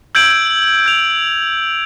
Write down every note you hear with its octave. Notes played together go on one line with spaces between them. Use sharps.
E6 G6 G#6 D7 F#7
G6 F7